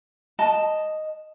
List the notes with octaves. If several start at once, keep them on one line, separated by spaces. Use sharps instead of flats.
D#5 A5